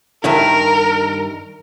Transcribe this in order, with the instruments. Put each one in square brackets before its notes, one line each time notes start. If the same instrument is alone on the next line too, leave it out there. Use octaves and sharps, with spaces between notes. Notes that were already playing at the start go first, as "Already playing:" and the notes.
[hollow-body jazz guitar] G2 D#3 E4 [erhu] A#4